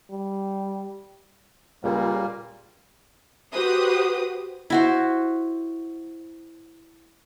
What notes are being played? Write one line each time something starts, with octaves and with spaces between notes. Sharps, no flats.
G3
C#2 A#2 G3 A#3
F#4 G4 B4 C5 D#6
E4 F#4 C5